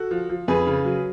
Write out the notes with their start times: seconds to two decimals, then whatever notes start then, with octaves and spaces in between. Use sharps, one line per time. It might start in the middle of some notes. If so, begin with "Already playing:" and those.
Already playing: F#4 A4
0.11 F3
0.29 F3
0.48 F2 G#4 B4
0.67 C#3
0.85 F#3